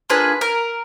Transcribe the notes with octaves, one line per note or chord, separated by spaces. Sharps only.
A#3 D4 F4 G#4 B4
A#4